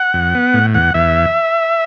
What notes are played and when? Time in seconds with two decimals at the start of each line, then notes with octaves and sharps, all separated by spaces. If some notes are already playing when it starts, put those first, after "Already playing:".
Already playing: F#5
0.14 F2
0.35 B3
0.54 A2
0.74 E2 F#5
0.94 E2 E5